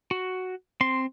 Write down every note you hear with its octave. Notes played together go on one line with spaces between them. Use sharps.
F#4
C4 C6